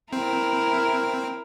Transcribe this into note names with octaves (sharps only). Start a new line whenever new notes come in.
C4 E4 A#4